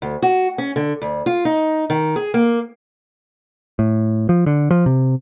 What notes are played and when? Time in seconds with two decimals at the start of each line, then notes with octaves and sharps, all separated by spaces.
0.02 D2
0.22 F#4
0.58 C#4
0.76 D3
1.01 D2
1.26 F4
1.45 D#4
1.90 D#3
2.16 G#4
2.34 A#3
3.79 A2
4.29 F3
4.46 D3
4.71 F3
4.86 C3